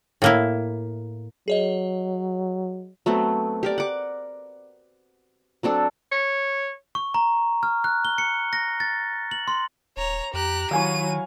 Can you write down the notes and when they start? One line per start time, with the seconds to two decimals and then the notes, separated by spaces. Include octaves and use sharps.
0.22 A2 A#3 E4
1.48 F#3 G#4 C#5 D#5
3.06 F#3 A3 B3 C4
3.63 G4 A#4 D5
3.78 F#5 D6
5.63 F#3 C4 D4 A4
6.12 C#5
6.95 C#6
7.14 A#5
7.63 F6
7.84 F#6
8.05 G7
8.18 C#7
8.53 A#6
8.80 A6
9.31 F#7
9.48 C6
9.97 D#1 C#5 A#5
10.34 F2 G4 A#5 F#6
10.71 D#3 F#3 E4 F5 G#5 C#6 D#7